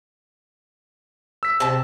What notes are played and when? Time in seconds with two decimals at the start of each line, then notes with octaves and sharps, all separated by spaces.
1.43 E6 B6
1.60 C3 A5